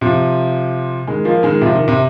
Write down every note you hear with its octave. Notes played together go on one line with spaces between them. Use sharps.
C3 F3
D#3 G#3
F3 A#3
D#3 G#3
C3 F3
D#3
C3